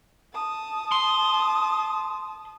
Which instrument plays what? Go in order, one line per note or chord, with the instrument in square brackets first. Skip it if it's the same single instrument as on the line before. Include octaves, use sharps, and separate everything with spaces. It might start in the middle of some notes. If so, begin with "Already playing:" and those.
[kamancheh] A5 D#6
[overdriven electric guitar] C6